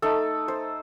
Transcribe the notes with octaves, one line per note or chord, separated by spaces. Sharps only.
A3 D#4 A4
C5